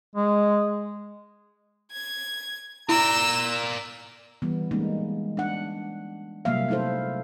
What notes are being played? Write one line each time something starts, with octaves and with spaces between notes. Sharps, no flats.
G#3
G#6
E4 A#4 D5 A#5 E6
E3 G3 B3
G3 G#3 A#3 C#4 D#4
D4 F#5
C3 F#3 G3 A#3 E5 F5
A3 D#4 E4 A4 C5